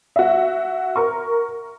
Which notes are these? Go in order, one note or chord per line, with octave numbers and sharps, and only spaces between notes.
F#4 E5
A#4 C#6